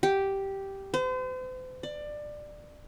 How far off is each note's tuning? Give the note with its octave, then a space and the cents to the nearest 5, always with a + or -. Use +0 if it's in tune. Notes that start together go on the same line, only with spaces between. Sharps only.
G4 -5
C5 -40
D5 +20